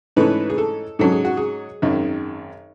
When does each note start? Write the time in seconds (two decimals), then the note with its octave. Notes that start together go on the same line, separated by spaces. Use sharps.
0.17 G#2 E3 A3 C#4 B4
0.50 G#4
0.58 A4
0.99 G#2 F#3 C#4 A4
1.12 G#4
1.25 F#4
1.37 G#4
1.82 G#1 F#2 D#3